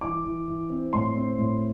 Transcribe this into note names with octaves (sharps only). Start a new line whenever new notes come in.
E3 D6
E3
E3
C4
A2 C6
C4
A2